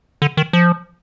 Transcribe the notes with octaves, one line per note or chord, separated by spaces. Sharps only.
D3
D#3
F3